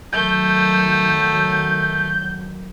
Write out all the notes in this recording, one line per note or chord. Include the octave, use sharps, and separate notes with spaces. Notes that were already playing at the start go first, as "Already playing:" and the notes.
D#3 F#3 A3 G6